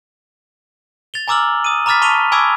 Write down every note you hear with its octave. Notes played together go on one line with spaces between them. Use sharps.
A6 F7 G7
G#5 A#5 D6 E6 F6 F#7
D#6 D#7
A#5 B5 D6 F6 A6 B6
A5 C#6 B6 D#7 F7 G7
G#5 B5 C#6 D6 E6 G#6